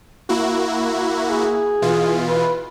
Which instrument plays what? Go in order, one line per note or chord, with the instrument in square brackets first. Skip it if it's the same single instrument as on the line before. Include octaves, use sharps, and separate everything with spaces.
[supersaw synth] A#3 E4 F#4
[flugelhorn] G#4
[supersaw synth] B2 E3 F4
[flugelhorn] B4